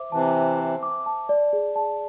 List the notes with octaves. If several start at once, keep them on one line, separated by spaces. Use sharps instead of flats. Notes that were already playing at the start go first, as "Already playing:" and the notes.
Already playing: C5 E5 D6
C3 E3 A5
E5
C5
D6
A5
D5
G#4
A5